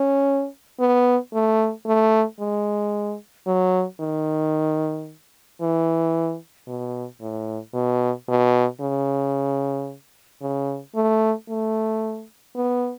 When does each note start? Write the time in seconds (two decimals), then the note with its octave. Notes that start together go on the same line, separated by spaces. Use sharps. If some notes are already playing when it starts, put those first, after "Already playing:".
Already playing: C#4
0.79 B3
1.33 A3
1.86 A3
2.40 G#3
3.47 F#3
4.00 D#3
5.61 E3
6.68 B2
7.21 A2
7.74 B2
8.28 B2
8.81 C#3
10.42 C#3
10.95 A3
11.49 A3
12.56 B3